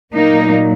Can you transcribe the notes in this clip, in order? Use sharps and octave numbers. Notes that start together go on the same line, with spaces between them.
A#2 F#3 A#3 D#4